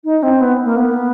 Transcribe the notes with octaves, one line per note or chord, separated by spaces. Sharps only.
D#4
C4
B3
A#3
B3